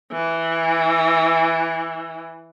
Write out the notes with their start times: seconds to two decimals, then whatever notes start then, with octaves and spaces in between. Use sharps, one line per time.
0.12 E3